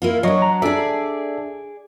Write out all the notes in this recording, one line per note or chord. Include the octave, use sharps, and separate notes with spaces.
A#3 E4 F4
F#3 D4 C#5 D#5 C#6
A#5
D4 G#4 A4 D5 E5